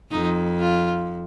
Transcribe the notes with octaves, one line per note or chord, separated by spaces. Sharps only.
F2 D#4
F4